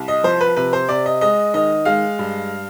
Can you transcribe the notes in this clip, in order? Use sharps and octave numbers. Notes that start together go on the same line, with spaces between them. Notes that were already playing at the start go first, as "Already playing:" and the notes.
Already playing: C2
D#5
F3 C5
B4
C3 B4
C5
C3 D5
D#5
G#3 D#5
D#3 D#5
G#3 F5
G2